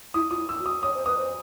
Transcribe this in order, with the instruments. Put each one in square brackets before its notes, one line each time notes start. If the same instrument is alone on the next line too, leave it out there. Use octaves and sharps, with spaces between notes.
[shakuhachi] E4 [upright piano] D#6
[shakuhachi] F4 [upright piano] D#6
[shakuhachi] E4
[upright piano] E6
[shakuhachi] F#4
[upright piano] D#6
[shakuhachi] C#5 [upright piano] D#6
[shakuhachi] C5
[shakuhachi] B4 [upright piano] D#6
[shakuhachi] C5